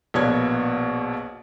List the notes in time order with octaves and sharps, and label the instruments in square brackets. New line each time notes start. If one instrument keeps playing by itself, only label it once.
[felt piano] A#1 B2 A#3 B3 C#5 G#6